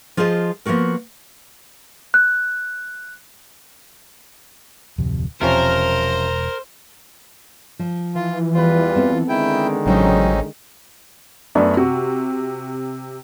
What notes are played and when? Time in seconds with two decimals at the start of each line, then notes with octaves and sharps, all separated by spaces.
0.17 F3 F4 G#4 C5 D#5
0.66 F3 A#3 B3 F#4 A#4
2.14 F#6
4.98 D1 F2 C3
5.42 E1 C3 F3 C#4 A#4 C5
7.79 F3
8.15 E3 F4
8.54 E2 G3 F4 B4
8.95 B3 C4 A4
9.29 D3 D#3 G#3 E4 G5
9.86 A1 C#3 F#3 C4 C#4 D#4 F4
11.55 F#2 A3 B3 D4
11.77 C3 F#4